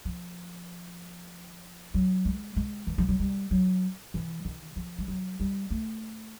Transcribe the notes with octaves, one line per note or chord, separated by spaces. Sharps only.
F3
F#3
G#3
G#3
E3
F3
F#3
G3
F#3
E3
D#3
F3
G3
F#3
G3
A3